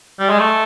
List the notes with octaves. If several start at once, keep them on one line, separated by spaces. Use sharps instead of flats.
G3
G#3
A3